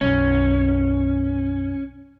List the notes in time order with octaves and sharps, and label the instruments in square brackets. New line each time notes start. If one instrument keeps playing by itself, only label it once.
[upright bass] B1 F#2 [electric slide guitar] C#4